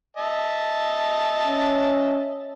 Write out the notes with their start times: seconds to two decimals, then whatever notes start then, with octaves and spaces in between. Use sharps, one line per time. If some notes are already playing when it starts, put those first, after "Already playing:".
0.17 D#5 E5 A5
1.47 C#4